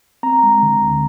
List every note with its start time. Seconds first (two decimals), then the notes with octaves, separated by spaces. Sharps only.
0.23 C4 A#5
0.43 G#3
0.63 D3
0.81 D2